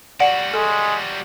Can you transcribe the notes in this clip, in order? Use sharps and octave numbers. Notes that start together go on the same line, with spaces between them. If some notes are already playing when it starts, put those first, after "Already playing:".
G3 F#4 D5 F#5
G#3 A4